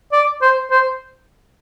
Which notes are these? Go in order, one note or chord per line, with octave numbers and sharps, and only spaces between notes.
D5
C5
C5